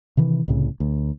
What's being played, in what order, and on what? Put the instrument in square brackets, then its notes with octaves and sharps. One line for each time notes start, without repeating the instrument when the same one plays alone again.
[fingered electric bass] C3 D#3 E3
C2 A2 C#3
D2